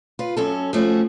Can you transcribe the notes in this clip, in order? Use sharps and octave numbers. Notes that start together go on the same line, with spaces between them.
F4 B4
F#2 C#4 A4
F3 A3 C#4 F#4